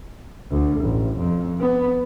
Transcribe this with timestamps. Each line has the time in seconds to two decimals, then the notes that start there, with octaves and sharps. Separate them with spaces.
0.51 D2
0.81 A1
1.19 F2
1.60 B3